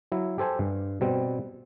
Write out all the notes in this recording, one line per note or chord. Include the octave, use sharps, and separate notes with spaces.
F#3 E4
G4 A4 C5 G#5 A5
G2
B2 G3 C4